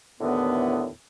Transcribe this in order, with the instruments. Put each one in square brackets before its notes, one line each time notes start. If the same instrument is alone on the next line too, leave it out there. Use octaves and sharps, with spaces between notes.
[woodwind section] D#2 A2 D3 E3 B3